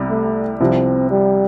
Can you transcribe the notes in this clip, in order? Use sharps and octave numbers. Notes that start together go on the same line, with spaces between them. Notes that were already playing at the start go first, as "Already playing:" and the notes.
Already playing: C2 C3 G3
A3
C2 C3 F3 C4
G3